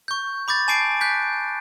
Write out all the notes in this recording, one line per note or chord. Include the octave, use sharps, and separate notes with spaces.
C#6 G6
B5 D6 G6 A6
G#5 A5 B5 D6 C7 D7
F#6 G6 B6